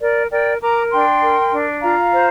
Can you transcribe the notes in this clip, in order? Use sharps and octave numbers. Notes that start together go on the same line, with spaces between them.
A#4 D5
A#4 D5 G5
A#4 A#5 D6
D4 G5 C6
A#4
D4
F4 F5 A#5
C5